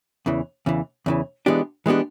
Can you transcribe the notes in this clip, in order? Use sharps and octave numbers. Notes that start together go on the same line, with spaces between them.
E2 C#3 E3
E2 C#3 E3
E2 C#3 E3
E3 G#3 B3 D4 G4
E3 G#3 B3 D4 G4